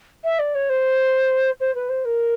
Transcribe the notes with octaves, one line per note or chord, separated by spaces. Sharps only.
E5
D5
C#5
C5
C5
B4
C5
A#4